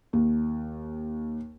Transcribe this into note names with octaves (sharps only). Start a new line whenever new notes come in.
D#2